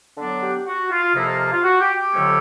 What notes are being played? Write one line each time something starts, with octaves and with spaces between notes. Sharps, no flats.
D3 F#3 B3 D4
G4
F#4
F4
F2 C3 F3 A#3 D#4 E4
F4
F4
F4
F#4
G4
G4
F2 D3 F#3 A3 C#4